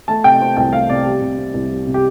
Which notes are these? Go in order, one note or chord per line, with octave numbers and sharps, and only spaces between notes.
A3 A5
C3 G5
C4
C2 G5
A3 F5
C3 D5
G3
C3
C4
C2
G3
C3
G4